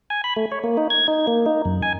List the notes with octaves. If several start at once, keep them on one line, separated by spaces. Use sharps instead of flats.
G#5
B5
A3
C#5
A#3
D#4
G#6
D#4
A#3
D#4
F#2
G#5